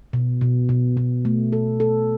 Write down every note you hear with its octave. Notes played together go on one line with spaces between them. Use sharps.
B2
B2
B2
B2
A3
A4
A4